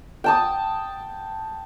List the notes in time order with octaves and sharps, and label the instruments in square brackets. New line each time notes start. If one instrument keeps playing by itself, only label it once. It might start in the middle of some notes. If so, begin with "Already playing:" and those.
[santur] G5 A5 D#6